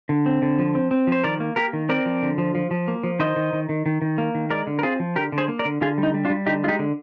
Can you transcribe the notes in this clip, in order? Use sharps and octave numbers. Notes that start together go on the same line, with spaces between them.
D3
C4
D3
F3
C4
C4
F3 C5
D#3 A#4 D5
A#3
A#3 G4 A#4
D#3
C4 A#4 D5
F3
D3
F3
F3
F3
A#3
F3
D#3 C5 D#5
D#3
D#3
D#3
D#3
D#3
A#3
D#3
G#3 A#4 D5
D3
A#4
C4 F4 G#4
F3
D3 G4 A#4
D3
G#4 C5
A#3
A#4 D5
D3
D3 F4 G#4
G3
D#4
G3
D4 F4
G3
D3 D#4 G4
G#3 D#4 F4 G4
D3